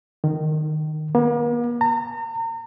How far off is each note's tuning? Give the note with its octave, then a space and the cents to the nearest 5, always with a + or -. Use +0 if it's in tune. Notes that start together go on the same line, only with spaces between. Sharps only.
D#3 -15
A#3 +45
A#5 -35